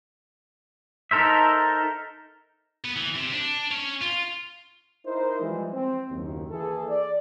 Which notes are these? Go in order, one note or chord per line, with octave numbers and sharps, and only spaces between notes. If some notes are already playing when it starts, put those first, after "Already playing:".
D#4 A4 A#4 C5 E5
B3
E3
C3
D4
C#4 C#5
F4
D#4 E4 A#4 C5
E3 F3 G3 G#3
C4
F#1 D#2
E3 A#3 G#4 A4
D5